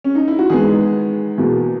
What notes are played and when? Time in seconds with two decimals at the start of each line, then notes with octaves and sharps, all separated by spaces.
0.04 C#4
0.15 D#4
0.28 E4
0.39 F#4
0.50 E2 D#3 G#3 B3 G#4
1.38 E2 B2 A#3